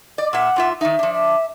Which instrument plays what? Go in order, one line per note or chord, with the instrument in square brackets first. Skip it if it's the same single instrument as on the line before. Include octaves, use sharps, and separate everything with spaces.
[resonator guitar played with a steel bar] D5 [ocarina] D#5
[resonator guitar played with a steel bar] A#2 E5 [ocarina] F#5
[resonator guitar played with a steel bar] G#2 F4 E5
[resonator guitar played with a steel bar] D#3 D#4 [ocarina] E5
[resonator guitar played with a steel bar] F3 D4
[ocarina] E5